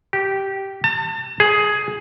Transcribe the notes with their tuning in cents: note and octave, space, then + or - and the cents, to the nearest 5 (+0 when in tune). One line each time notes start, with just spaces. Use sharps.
G4 -10
A5 +35
G#4 +10